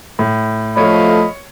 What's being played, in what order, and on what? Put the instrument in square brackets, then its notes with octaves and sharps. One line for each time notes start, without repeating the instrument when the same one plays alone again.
[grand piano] A2
[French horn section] F3 A3 [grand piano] C#5 [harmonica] D#5 F5 B5